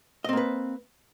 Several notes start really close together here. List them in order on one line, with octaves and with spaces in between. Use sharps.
D#5 C4 A#3 B4